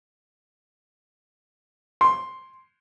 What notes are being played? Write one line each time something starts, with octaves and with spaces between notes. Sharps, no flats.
C6